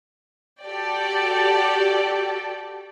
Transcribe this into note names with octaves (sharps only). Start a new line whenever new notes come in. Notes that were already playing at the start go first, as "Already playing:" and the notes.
F#4 G4 A4 D5 G5